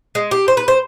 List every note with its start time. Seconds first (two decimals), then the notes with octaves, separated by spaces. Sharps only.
0.15 G#3
0.31 G4
0.48 C5
0.57 B4
0.68 C5